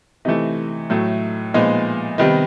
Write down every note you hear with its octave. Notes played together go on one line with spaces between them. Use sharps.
C3 E3 A3 D#4
A2 F#3 A3
A#2 F3 G#3 B3 D#4
C3 D#3 G3 B3 D#4